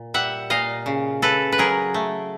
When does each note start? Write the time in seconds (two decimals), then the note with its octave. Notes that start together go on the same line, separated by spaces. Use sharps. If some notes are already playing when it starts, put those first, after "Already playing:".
Already playing: A#2
0.14 G3 E5 F#5
0.50 A#2 D#5 F5
0.86 C#3
1.22 C#3 A4 B4
1.52 B4
1.58 F#3 G#4 A#4
1.94 A3